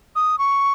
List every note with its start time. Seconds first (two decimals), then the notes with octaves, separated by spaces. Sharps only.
0.15 D#6
0.38 C#6